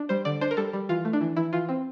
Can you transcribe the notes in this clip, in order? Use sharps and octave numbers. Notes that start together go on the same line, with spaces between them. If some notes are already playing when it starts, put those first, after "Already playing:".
Already playing: D4
G3 C5
D3 D5
D4 C5
A#4
G3 A4
G3
E3 F4
A3
D4
E3
E3 E4
E3 F4
C4